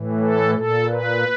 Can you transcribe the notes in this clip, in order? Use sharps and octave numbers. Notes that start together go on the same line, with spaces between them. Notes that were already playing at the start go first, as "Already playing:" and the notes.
Already playing: A2 E3
A4
A#2 A4
B4